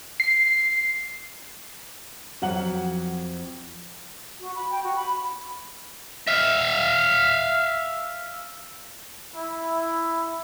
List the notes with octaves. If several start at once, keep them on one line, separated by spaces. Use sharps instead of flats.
C7
F2 F#3 F#5 F#7
F#4
B5
G5
F#4
B5
E5 F5
E4